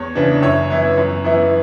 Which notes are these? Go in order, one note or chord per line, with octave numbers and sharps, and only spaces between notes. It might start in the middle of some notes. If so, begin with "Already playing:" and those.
Already playing: E2 C#5
C#3 E3 B3 D4
F#2 C#5 E5
E3 B3 E4
F#2
E3 B3 E4